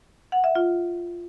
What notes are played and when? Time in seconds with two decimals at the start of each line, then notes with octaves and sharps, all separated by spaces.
0.32 F#5
0.44 E5
0.55 F4